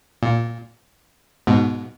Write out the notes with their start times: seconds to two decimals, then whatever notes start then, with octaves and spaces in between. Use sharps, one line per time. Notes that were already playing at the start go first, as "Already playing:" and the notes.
0.23 A#2
1.47 G#2 B2